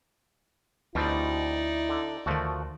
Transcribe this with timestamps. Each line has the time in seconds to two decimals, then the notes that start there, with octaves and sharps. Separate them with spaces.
0.95 D2 B2 G3 C4 D#4 E4 D5
1.89 D3
2.26 D2 D#3 F3 A3 F#4